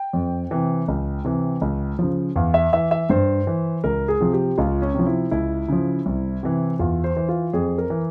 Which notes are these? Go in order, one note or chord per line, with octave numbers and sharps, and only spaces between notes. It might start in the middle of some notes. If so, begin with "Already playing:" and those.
Already playing: G5
F2
C3 E3
C#2
C3 E3
C#2
C#3 F3
E2 F5
E5
E3 E5
E5
G2 C5
E3
C#2 A#4
G#4
C3 F3
G4
C#2 F4
C#4
C3 F3
E4
C#2 E4
C#3 F3
C2
C3 E3
E2 F4
C5
E3
F4
F2 G#4
A#4
E3